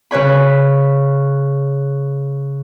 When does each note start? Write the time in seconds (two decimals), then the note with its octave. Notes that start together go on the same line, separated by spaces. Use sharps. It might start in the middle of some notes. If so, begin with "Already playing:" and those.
0.11 C#3 B4 C#5 B5